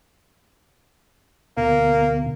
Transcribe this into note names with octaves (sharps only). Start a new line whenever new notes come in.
D2 B2 A#3